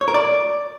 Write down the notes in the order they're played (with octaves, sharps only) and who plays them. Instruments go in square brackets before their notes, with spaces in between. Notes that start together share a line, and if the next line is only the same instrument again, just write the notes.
[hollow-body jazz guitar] C#5
A#4
D5